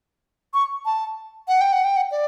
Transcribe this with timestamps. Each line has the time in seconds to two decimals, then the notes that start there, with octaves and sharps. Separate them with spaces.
0.54 C#6
0.85 A5
1.48 F#5
1.61 G5
1.72 F#5
1.84 G5
1.96 F#5
2.11 D5